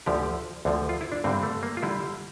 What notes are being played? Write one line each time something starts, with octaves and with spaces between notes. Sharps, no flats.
D2 D3 F3 G4
D2 D3 F3
F4
E4
D4
G2 D3 G3 C4
A3
A#3
F4
D3 G3 E4